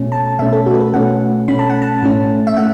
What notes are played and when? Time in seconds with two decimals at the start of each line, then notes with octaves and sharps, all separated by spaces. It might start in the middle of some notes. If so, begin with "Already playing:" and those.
Already playing: B2 A3 C#4
0.12 A5
0.39 B2 A3 C#4 E5
0.53 A4
0.66 F#4
0.74 B4
0.80 A4
0.94 B2 A3 C#4 F#5
1.48 B2 A3 C#4 B5
1.59 A5
1.70 F#5
1.82 A5
2.03 A2 A3 C#4
2.47 E5
2.57 A2 A3 F#5